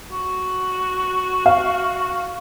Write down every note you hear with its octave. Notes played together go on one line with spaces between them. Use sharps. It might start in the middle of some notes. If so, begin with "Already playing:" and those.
F#4
F5